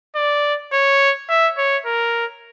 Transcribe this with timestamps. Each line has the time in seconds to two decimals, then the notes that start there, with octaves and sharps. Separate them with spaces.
0.15 D5
0.73 C#5
1.29 E5
1.58 C#5
1.86 A#4